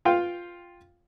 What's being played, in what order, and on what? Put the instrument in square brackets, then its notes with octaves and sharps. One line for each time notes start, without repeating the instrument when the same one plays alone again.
[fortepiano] F4 F5 G5